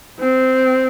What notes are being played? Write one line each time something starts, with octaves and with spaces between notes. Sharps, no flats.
C4